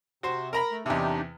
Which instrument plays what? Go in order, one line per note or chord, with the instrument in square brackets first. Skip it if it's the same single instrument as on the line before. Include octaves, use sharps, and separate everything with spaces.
[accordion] C3 [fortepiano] F#4 C5
[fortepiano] A#4 A#5 B5
[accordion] A3
[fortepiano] E2 C3 [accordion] D4 D#4 G4